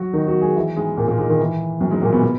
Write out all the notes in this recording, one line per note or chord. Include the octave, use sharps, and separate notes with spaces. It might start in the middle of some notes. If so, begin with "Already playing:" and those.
Already playing: F#3 F#4
D#3 D#4
F#3 F#4
G#3 G#4
E3 E4
G#2 G#3
A#2 A#3
A#2 A#3
G#2 G#3
D#3
E3
F#2 F#3
G#2 G#3
A#2 A#3
B2 B3
B2 B3